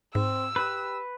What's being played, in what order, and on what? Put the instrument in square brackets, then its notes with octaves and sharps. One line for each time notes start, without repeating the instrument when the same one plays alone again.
[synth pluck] G#2 [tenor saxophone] C4 [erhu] E6
[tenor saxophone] G4 [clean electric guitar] B4